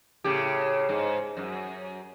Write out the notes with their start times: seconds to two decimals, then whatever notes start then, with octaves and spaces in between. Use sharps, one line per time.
0.24 A2 C#3 G4
0.89 G#2
1.37 F#2